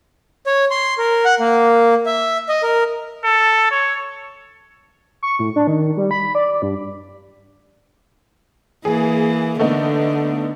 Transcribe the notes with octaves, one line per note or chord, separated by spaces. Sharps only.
C#5
C6
A#4
F#5
A#3
E5
D#5
A#4
A4
C#5
C#6
A2
D4
D#3
G3
B5
D5
G2
E3 A#3 G#4
D3 A3 B3 D#4